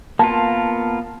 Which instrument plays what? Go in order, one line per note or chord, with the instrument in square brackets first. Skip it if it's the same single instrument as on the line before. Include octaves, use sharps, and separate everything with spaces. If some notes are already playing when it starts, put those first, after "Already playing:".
[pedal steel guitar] A#3 B3 F4 [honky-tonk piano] A5